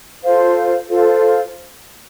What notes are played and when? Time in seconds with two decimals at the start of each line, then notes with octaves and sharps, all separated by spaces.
0.23 F4 A4 C5 F5
0.89 F4 A4 C5 F5